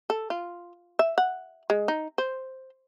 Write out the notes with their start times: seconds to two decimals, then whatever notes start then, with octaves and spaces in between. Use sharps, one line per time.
0.10 A4
0.30 F4
0.99 E5
1.18 F#5
1.70 G#3
1.88 D#4
2.18 C5